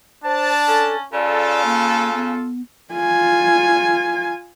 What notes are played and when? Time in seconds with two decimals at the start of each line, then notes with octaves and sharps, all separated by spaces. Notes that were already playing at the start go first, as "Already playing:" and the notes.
0.24 D4 C5 A5
0.68 C#4 A4
1.13 C#3 F4 A4 D5
1.65 A#3
2.15 B3
2.94 F4 G#5